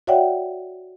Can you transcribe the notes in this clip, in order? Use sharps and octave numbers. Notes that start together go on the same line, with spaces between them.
F#4 C#5 D5 E5 F#5 G5